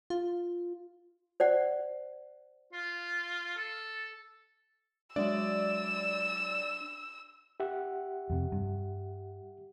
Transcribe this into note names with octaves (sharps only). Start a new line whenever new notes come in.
F4
C5 D5 F#5
F4
A4
F#3 G#3 D4 D5 E5 E6
G4 E5 F#5
F2 C3
G2